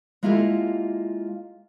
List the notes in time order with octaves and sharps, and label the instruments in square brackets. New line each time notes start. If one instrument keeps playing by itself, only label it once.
[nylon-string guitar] G#3 A#3 E4 F4 G4 A4